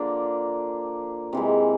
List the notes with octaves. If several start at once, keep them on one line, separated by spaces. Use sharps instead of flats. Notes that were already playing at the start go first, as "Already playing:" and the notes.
Already playing: D3 F3 A#3 D4
C3 E3 G#3